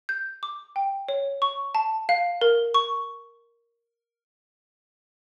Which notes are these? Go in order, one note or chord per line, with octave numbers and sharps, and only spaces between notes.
G6
D6
G5
C#5
C#6
A5
F5
A#4
C#6